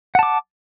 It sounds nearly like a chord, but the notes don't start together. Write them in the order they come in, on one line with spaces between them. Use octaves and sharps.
F#5 A5 D6